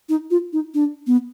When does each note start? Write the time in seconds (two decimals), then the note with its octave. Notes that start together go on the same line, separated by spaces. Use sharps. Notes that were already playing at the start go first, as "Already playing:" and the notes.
0.09 D#4
0.31 F4
0.53 D#4
0.74 D4
1.07 B3